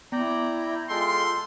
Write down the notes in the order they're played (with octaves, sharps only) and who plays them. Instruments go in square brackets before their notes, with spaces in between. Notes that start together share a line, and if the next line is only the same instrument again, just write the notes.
[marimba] B3 [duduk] E4 [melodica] D5 G5 A#5
[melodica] G#3 A4 G5 [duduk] F4 [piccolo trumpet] C6